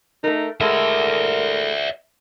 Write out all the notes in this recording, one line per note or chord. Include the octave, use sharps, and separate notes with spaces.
A3 D#4 A#4
A2 G#3 A4 A#4 D5 E5